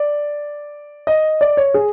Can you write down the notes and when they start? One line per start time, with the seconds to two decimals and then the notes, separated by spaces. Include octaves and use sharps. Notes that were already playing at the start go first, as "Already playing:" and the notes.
Already playing: D5
1.07 D#5
1.41 D5
1.57 C#5
1.74 G#4